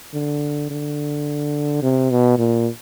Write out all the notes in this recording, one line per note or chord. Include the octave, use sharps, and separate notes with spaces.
D3
D3
C3
B2
A#2